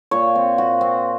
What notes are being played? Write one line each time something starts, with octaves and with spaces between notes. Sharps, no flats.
A#2 C#5
C4
A#2 F#4
C4